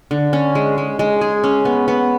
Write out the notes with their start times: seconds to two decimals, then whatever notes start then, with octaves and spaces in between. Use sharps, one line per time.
0.11 D3
0.33 C#4
0.55 G#3
0.78 G#3
0.99 G#3
1.21 G#4
1.44 C#4
1.65 B3
1.88 B3